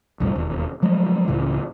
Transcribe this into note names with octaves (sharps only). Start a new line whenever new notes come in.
B1 E2 A2 G3
E1 D#2
F3 F#3 G#3 A3
C#2 A2 C#3 E3